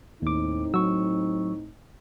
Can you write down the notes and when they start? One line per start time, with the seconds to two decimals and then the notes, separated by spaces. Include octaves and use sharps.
0.22 D#2 A2 C4 D#4 D6
0.74 F#3 C#6 E6